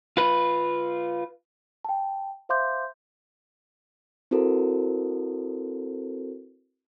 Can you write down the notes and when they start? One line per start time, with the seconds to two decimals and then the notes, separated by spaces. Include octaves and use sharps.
0.17 F4 B4
1.85 G5 A5
2.49 C5 E5 F5 C6 D6 G6
4.31 C4 E4 F#4 A4 A#4 C5